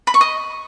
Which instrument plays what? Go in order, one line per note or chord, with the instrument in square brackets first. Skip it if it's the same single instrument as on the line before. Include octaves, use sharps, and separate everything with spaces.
[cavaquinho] B5
C#6
D#5